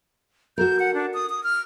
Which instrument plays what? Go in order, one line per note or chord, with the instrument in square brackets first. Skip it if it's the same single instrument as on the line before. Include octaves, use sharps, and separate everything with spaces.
[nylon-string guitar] F#4 A4 A#4 [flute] G6
[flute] F#5
D4
D#6
D#6
F6